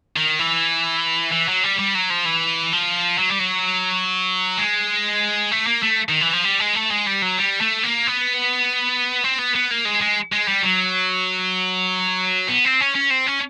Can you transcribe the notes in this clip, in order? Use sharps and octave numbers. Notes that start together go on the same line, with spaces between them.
D#3
E3
E3
F#3
G3
G3
F#3
F3
E3
F3
F#3
G3
F#3
G#3
A3
A#3
A3
D#3
E3
F3
G3
G#3
A3
G#3
G3
F#3
G3
A3
A#3
B3
C4
B3
B3
A#3
G#3
G#3
G#3
G3
F#3
B3
C4
C#4
C#4
C4
C#4